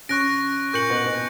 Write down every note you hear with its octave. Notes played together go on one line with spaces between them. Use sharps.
C#3 C#4 C#6 F#6 A#6 D7
A#2 A#3 C#6 G6 C#7 F#7
B2 B3
B2 B3